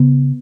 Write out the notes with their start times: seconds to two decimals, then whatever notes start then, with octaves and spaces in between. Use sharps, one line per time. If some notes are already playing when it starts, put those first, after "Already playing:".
Already playing: C#3 B3